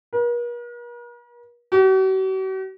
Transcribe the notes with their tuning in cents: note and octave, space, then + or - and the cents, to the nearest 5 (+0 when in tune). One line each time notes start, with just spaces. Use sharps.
A#4 +45
F#4 +45